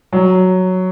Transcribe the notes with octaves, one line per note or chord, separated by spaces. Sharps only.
F#3